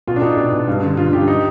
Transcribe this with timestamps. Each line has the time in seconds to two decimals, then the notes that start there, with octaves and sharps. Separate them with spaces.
0.07 B2 F4
0.16 D4
0.22 B2 D#4
0.37 B2
0.53 B2
0.68 G2
0.83 D3
0.97 D3 F4
1.13 G2 G4
1.27 D#4